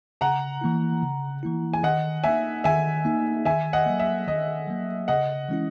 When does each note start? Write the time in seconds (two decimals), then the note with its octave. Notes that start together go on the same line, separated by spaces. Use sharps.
0.21 C#3 F#5 A#5
0.61 E3 A#3 E4
1.02 C#3
1.43 E3 A#3 E4
1.73 G#5
1.83 D#3 D#5 F#5
2.24 A#3 D#4 E5 G#5
2.64 D#3 E5 G#5
3.05 A#3 D#4
3.45 D#3 E5 G#5
3.73 D#5 F#5
3.86 F#3 A#3
4.00 E5
4.27 D#3 D#5
4.67 F#3 A#3
5.08 C#3 D#5 F#5
5.49 E3 G#3 C#4 E4